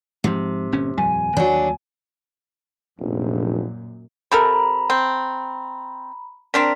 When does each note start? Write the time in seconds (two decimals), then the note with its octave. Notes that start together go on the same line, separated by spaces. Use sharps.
0.24 G#2 C3 F3
0.72 G1 A#2 C#4
0.98 D#1 F2 G3 G#5
1.37 D#2 F#3 D4
2.99 F1 A#1 F#2 A#2
4.32 C3 A4 A#4 A#5 B5
4.90 C4
6.54 C4 D4 A#4 B6